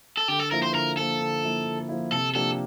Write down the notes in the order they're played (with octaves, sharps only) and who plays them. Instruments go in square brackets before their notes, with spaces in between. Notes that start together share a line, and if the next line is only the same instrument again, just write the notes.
[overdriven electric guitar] A4
[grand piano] D3 [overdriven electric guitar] G4
[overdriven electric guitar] A4
[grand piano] F3 A#3 E4 [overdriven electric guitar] A#4
[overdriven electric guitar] C5
[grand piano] D3 [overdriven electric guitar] A#4
[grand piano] F3 A#3 E4 [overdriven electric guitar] A4
[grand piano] D3
F3 A#3 E4
D3
F3 A#3 E4
[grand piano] C3 [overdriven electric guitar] A4
[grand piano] F3 A#3 D4 G4 [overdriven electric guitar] A4